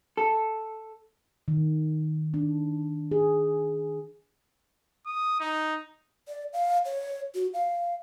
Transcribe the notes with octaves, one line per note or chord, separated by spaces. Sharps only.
A4
D#3
D4
G#4
D#6
D#4
D5
F5
C#5
F#4
F5